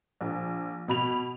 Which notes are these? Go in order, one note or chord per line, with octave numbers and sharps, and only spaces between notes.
A#1
B2 B5 F7